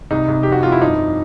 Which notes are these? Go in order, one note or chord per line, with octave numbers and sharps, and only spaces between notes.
C2 D#4
C2
F2 G4
F#4
F2 F4
E4
G2 D#4